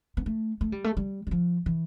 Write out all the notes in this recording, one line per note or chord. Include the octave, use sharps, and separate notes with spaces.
B3
A3
A3
G3
A3
G3
G3
F3
E3